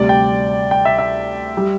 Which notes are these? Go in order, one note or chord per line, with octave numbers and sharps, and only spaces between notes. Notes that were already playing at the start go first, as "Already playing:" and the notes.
Already playing: D2 C3 G3 D5
G5
G5
E5
E5
G3